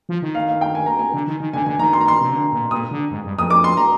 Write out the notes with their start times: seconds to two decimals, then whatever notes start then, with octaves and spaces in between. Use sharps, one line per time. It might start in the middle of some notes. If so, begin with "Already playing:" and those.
0.09 F3
0.22 D#3
0.35 F5
0.49 F5
0.61 G5
0.75 G#5
0.86 A#5
0.99 G#5
1.14 D3
1.27 D#3
1.40 D#3
1.53 D3 G#5
1.66 D3 G#5
1.79 D#3 A#5
1.93 C6
2.01 A#5
2.08 C6
2.21 C3
2.33 D3
2.52 A#2
2.71 A#2 D#6
2.91 D3
3.11 G#2
3.24 G2
3.37 F2 D#6
3.50 D6
3.64 C6
3.77 A#5